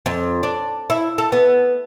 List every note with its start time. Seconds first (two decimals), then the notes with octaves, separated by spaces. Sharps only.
0.06 F2
0.43 D4
0.90 E4
1.18 A4
1.32 B3